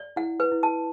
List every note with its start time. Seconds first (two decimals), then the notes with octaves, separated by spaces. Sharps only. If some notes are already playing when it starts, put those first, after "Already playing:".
Already playing: D5
0.16 E4 F#5
0.40 B4
0.52 E4
0.63 A5